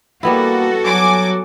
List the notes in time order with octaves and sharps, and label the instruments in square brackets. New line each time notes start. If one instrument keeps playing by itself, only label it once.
[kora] G3 B3 E4 [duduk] A#3 [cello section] F#4 A4
[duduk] F#3 [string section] G#5 D6